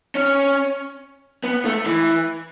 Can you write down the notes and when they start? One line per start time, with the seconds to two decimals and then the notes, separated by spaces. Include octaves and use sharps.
0.15 C#4
1.44 B3
1.65 A3
1.86 E3